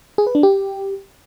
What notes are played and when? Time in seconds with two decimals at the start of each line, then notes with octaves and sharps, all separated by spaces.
0.18 G#4
0.27 B4
0.35 D4
0.43 G4